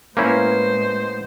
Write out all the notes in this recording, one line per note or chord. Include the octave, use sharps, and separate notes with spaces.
A2 G#3 A#3 B3 C#4 E4 C5